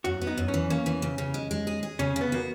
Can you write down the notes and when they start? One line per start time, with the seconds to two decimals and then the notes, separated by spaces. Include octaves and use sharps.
0.04 F#2 F#4
0.21 B3
0.27 D#4
0.38 F#2
0.48 C#4
0.54 E3
0.70 A#3 C#4
0.86 E3
1.02 C#3
1.18 C#3
1.34 G#3
1.51 G#3
1.67 G#4
1.83 G#4
1.99 C#3 C#4
2.16 C#3 B3
2.32 A#3 F#4